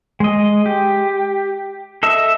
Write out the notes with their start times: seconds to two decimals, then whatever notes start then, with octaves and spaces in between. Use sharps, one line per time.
0.20 G#3 D#5
0.66 G4
2.03 A4 D#5 E5